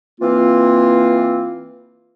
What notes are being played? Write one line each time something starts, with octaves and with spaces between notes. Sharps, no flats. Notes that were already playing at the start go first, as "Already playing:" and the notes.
E3 A#3 C4 F4